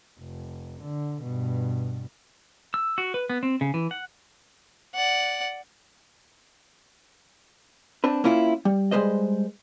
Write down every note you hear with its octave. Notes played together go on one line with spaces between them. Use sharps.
F1
D3
G2 B2
E6
F#4
B4
B3
C4
C#3
E3
F#5
D5 F#5
C4 D4 B4
A#3 C#4 E4 F4
G3
G3 G#3 B4 C5 D#5